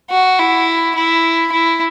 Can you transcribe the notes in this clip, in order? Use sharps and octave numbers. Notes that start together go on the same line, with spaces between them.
F#4
E4
E4
E4